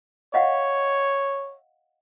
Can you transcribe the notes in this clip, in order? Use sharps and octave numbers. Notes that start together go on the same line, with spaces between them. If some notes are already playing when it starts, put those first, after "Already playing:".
C#5 D#5 F5 F#5